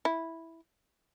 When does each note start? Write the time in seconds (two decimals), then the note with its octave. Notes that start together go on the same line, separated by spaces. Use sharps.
0.05 E4